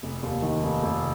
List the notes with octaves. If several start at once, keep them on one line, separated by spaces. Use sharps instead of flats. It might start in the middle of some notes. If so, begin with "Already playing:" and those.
F1
D#2
D#3
F1
F1